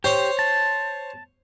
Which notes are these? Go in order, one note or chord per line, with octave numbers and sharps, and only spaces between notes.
G4 C5 C#5
A5